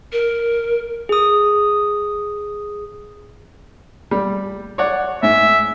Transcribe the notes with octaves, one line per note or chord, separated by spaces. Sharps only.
A#4
G#4 D#6
G3
C#5 D5 F#5
G#2 E5